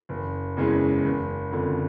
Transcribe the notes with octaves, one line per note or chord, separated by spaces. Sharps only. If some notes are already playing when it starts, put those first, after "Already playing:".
F#1
E2 C#3 E3 G#3
F#1
F2 D3